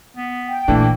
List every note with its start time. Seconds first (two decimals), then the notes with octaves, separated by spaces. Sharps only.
0.16 B3
0.48 G5
0.68 A#2 E3 A3 A#3 D4